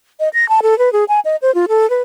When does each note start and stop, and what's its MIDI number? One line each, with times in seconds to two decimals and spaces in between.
0.20 0.29 75
0.34 0.48 94
0.49 0.60 81
0.62 0.77 69
0.79 0.92 71
0.93 1.04 68
1.09 1.20 80
1.25 1.36 75
1.42 1.53 72
1.55 1.66 65
1.69 1.89 69
1.90 2.02 71